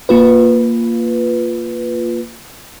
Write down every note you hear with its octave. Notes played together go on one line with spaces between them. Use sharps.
A#3 F4 B4